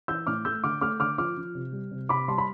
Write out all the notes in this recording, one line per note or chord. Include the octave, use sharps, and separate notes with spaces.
E3 E6 G6
A2 D6 F6
A3 E6 G6
D3 D6 F6
A3 D6 F6
D3 D6 F6
F3 D6 F6
F3
C3
G3
C3
C3 B5 D6
G3 A5 C6
B5